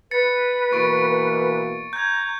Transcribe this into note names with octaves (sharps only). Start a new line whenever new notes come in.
B4 A6 C#7
B2 E3 A#3 C#6 A6 D7
A#5 G6 G#6